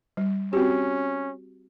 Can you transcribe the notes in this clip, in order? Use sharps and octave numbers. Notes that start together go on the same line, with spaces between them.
G3
C4 C#4 F#4 G4